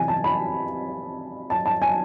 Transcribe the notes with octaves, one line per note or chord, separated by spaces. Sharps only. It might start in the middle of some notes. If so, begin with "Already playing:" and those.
Already playing: C3 E3 G#5
A5
B5
A5
A5
G#5